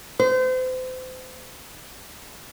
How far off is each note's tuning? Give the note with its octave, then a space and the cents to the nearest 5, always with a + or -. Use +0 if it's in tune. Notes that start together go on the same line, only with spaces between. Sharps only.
C5 -35